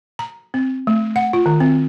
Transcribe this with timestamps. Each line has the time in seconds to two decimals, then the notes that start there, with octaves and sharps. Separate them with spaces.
0.19 A#5
0.54 C4
0.87 A3
1.16 F#5
1.33 F4
1.46 D#3
1.60 C4